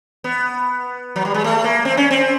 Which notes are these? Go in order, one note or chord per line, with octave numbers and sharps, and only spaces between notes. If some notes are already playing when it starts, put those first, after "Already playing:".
B3
F#3
G3
G#3
A3
A#3
C4
C#4
C4